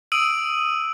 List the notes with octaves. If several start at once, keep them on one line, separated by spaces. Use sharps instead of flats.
D#6 E6 D7 D#7 F#7